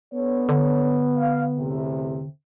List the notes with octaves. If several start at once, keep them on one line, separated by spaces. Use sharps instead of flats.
B3 D4 A4 C#5
D3
F5
E2 A2 C3